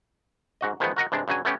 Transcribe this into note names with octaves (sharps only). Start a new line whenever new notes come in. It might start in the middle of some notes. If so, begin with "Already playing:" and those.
G#2 F#4 D#5
D#3 F3 G#3 A3 B3
F#4 A#4 D#5 F#5
G2 C3 G#3 D4
G2 C#3 F#3 G#5
A3 B3 C#4 G4